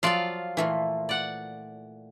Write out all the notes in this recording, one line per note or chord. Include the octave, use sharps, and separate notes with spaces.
F3 F#3 F4 D5 F5 C6
A#2 E3 A3 F4
D5 F#5